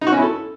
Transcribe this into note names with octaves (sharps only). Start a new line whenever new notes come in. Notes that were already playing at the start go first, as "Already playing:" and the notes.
D#4
F#4
C#4
E4
A4